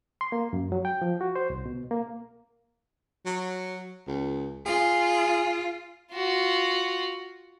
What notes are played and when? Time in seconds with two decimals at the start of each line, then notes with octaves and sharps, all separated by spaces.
0.21 C6
0.32 A#3
0.53 F#2
0.72 F#3
0.85 G5
1.02 F3
1.21 F#4
1.36 C5
1.50 C2
1.66 B2
1.91 A#3
3.25 F#3
4.08 C#2
4.66 F4 G#4
6.13 F4 F#4